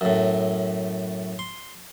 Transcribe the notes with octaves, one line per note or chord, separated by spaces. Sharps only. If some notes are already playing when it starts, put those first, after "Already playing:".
F#2 A2
C6